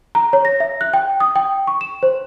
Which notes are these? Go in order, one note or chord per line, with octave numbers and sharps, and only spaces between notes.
A#5
C#5
A#6
E5
F#6
G5
D#6
G5
C#6
E7
C5